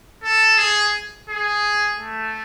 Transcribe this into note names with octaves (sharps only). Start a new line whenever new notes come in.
A4
G#4
G#4
A3